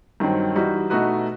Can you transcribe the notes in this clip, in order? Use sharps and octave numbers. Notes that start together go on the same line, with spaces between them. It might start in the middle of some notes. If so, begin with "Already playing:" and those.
G2 D#3 F#3 C4
E3 G3 D#4 F#4 B4
B2 A3 D#4 F#4 B4